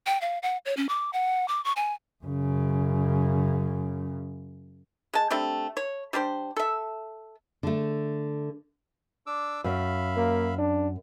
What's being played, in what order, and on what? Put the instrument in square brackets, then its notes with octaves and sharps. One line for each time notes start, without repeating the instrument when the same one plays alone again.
[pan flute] G5
F5
F#5
C#5
C#4
D6
F#5
D6
C#6
G#5
[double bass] F#2 C#3
[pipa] G#3 A5
G3 A3 C4 D4
C#5
G3 D4 G4 C5
A4 E5
[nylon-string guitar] D3 A3
[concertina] D4 D6 E6
[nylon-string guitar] F#2 [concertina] E5 F5 B5
[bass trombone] A#3
D4